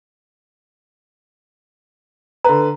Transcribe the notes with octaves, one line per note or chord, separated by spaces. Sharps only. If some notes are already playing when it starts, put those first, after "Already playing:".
D3 B4 A#5